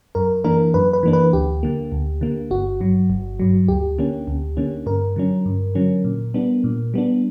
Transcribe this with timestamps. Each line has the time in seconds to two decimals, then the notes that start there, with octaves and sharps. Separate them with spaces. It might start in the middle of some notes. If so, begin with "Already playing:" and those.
0.15 F#2 A#4
0.44 E3 A#3 D4 A#4
0.74 F#2 B4
0.93 B4
1.03 E3 A#3 D4
1.13 B4
1.33 D2 G4
1.63 D3 A#3
1.92 D2
2.21 D3 A#3
2.51 G1 F#4
2.81 G2 F#3
3.10 G1
3.40 G2 F#3
3.68 D2 G4
3.99 D3 A#3 C#4
4.28 D2
4.57 D3 A#3 C#4
4.86 G2 A#4
5.16 D3 F#3 C#4
5.46 G2
5.75 D3 F#3 C#4
6.04 A#2
6.34 G3 B3 D4
6.64 A#2
6.94 G3 B3 D4